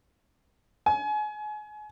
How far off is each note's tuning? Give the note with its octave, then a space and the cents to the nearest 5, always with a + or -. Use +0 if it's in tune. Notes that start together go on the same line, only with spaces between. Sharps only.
G#5 +30